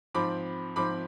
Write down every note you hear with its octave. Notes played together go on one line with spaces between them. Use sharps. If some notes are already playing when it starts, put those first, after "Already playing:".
G#2 F3 C4 B5 D6
G#2 F3 C4 B5 D6